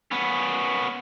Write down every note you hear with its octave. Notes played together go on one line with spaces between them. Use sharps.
B3 C#4